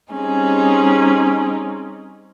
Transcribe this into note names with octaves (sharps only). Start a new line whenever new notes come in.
G3 C4 C#4 D#4 G#4